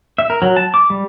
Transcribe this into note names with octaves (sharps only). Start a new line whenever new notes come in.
E5
A#4
F#3
A5
D6
G3